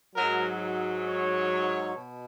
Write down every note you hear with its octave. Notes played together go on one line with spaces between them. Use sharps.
G#2 F#3 A#4
C#5
B2